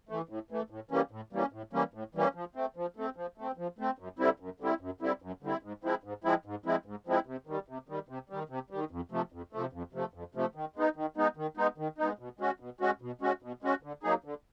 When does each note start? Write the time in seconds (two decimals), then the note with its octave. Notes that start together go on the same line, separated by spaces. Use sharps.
0.09 E3 A3
0.29 A2
0.51 E3 A3
0.70 A2
0.91 E3 G3 A#3 C#4
1.11 A2
1.33 E3 G3 A#3 C#4
1.52 A2
1.73 E3 G3 A#3 C#4
1.94 A2
2.15 E3 G3 A#3 C#4
2.35 F3
2.55 A3 C4
2.76 F3
2.96 A3 C4
3.16 F3
3.38 A3 C4
3.57 F3
3.79 A3 C4
3.99 F#2
4.19 D3 G3 C4 E4
4.40 F#2
4.60 D3 G3 C4 E4
4.81 F#2
5.01 D3 G3 C4 E4
5.22 F#2
5.42 D3 G3 C4 E4
5.63 G#2
5.84 F3 G#3 C4 E4
6.04 G#2
6.24 F3 G#3 C4 E4
6.45 G#2
6.65 F3 G#3 C4 E4
6.86 G#2
7.07 F3 G#3 C4 E4
7.27 C3
7.47 D#3 G3
7.68 C3
7.89 D#3 G3
8.09 C3
8.29 D#3 G3
8.49 C3
8.70 D#3 G3
8.91 F2
9.11 C3 F3 A3
9.32 F2
9.53 C3 F3 A3
9.73 F2
9.93 C3 F3 A3
10.14 F2
10.35 C3 F3 A3
10.55 D#3
10.76 G#3 B3 D#4
10.96 D#3
11.17 G#3 B3 D#4
11.37 D#3
11.57 G#3 B3 D#4
11.78 D#3
11.98 G#3 B3 D#4
12.19 B2
12.39 G#3 C#4 F#4
12.60 B2
12.81 G#3 C#4 F#4
13.02 B2
13.21 G#3 C#4 F#4
13.43 B2
13.63 G#3 C#4 F#4
13.83 D3
14.03 F#3 A#3 D#4 G#4
14.24 D3